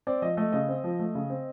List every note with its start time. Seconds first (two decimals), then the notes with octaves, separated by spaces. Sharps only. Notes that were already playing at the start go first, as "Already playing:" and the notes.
0.07 C4 D5
0.22 F3 D#5
0.37 A3 D#5
0.52 C#3 D#5
0.68 C4
0.84 F3
0.99 A3
1.15 C#3
1.30 C4